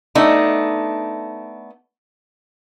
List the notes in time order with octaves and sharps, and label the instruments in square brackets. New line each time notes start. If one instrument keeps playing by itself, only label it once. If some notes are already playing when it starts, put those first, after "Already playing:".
[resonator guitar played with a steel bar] A3 B3 D4 D#4